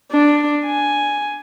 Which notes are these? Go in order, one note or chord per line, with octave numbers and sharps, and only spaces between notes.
D4
G#5